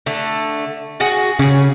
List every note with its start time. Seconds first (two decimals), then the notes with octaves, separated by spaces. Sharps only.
0.06 D3 A3
1.00 F#4 G#4 F#5
1.39 C#3 G#4 C#5